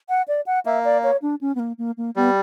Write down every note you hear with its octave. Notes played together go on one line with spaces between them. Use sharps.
F#5
D5
F#5
A#3 E5
D5
C#5
D4
C#4
B3
A#3
A#3
A#3
G3 B3